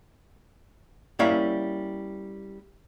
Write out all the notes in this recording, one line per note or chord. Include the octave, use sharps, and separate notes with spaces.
G3 A#3 C#4 E4 E5 F5